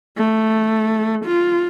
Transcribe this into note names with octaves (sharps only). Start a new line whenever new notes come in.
A3
F4